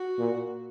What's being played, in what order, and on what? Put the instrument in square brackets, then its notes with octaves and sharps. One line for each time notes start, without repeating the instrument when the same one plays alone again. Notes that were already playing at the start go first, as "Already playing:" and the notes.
Already playing: [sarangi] F#4
[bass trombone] A#2